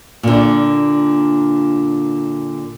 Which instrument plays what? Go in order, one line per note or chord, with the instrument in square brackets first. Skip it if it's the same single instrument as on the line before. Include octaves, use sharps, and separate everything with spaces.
[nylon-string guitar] A#2 D3